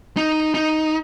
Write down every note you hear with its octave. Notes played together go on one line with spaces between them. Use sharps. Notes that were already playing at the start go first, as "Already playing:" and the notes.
D#4
D#4